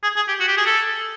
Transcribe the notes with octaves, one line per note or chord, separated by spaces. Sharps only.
G#4
G#4
G4
F#4
G4
G#4
A4